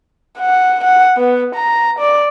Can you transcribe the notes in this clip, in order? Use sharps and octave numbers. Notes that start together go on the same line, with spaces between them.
F#5
F#5
B3
A#5
D5